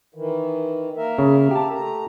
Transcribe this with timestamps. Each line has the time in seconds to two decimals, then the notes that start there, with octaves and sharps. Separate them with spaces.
0.15 D#3 E3
0.97 A#3 A#4 E5
1.18 C#3
1.51 G4 A5
1.74 A3 A#5